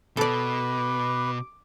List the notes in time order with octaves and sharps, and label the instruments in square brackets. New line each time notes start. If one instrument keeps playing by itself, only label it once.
[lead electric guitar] B2 [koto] A4 D5 [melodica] B4 [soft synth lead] D6